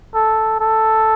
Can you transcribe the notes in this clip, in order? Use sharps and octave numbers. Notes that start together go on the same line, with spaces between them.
A4
A4